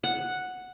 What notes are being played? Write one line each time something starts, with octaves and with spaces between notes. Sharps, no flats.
F#5